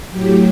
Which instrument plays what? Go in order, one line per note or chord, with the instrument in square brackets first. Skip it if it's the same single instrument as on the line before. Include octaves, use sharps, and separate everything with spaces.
[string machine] A2 F#3 G4